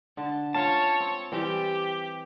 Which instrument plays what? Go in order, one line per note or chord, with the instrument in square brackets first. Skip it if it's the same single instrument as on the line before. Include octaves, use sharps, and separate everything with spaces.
[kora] D3 [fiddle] A5
[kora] C#4 F4 [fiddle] C#5 [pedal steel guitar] A5
[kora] C4
[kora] E3 G3 C4 [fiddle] G4